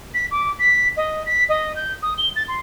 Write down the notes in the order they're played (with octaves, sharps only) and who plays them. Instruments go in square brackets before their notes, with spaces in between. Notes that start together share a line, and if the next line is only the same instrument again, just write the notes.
[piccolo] B6
D6
B6
D#5
B6
D#5
G6
D#6
G7
A6
C6